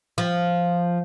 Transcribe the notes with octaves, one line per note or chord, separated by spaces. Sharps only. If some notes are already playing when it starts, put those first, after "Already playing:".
F3